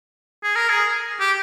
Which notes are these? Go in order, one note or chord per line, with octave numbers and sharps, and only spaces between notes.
G#4
A#4
G#4
G4